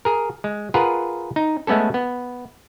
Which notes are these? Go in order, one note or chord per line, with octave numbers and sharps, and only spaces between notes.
G#4 A#4
G#3
F4 G#4 A#4 B4 F#5
D#4
G#3 A3 B3 C#4 A4
B3